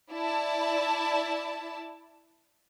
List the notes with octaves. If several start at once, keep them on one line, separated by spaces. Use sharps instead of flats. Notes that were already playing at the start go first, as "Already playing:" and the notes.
E4 D5 A5